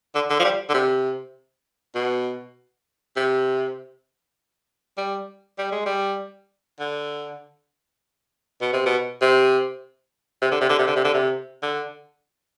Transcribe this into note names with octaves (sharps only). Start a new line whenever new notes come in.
D3
D3
F3
G3
D3
C3
B2
C3
G3
G3
G#3
G3
D3
B2
C3
B2
C3
C3
D3
C3
D3
C3
D3
C3
D3
C3
D3